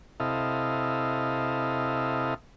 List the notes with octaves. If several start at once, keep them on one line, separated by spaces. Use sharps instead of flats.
C3 E4 A4 D#5 F5